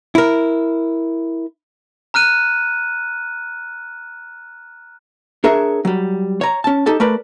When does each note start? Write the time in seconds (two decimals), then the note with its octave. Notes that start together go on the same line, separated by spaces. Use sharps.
0.15 E4 A#4
2.14 A#5 F6 F#6 D#7
5.44 D4 G#4 A#4 C#5 E5
5.85 F#3 G3
6.41 C#5 A#5
6.64 C#4 A5
6.86 D#4 G4 A4 A5
7.00 A3 A#4 B4 D5